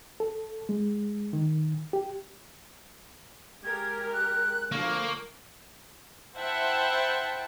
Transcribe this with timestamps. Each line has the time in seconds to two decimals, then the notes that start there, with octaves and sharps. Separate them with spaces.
0.20 A4
0.69 G#3
1.33 D#3
1.93 G4
3.64 G#3 G4 A#4 G#6
4.13 F#6
4.72 D3 F3 A#3 C#6
6.36 E4 C5 E5 F#5 G5 A5